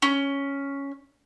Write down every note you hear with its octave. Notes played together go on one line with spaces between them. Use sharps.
C#4